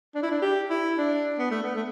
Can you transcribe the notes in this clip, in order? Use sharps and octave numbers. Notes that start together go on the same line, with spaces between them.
D4
E4
D4
G4
E4
D4
B3
A3
B3
A3